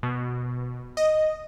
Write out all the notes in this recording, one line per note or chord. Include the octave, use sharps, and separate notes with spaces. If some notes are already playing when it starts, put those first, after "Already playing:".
B2
D#5